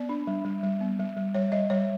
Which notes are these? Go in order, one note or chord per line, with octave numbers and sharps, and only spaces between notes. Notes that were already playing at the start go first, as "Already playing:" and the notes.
Already playing: B3 D5
D4
G3
G3
G3
B3
G3
G3
G3 C#5
G3 D#5
G3 C#5